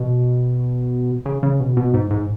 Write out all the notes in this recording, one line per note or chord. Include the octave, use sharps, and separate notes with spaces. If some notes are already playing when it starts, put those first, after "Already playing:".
Already playing: B2
C#3
C#3
B2
B2
G#2
G#2